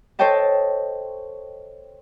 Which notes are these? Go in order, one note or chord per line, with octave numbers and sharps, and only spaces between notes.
A4 C5 C#5 D#5 G5 A5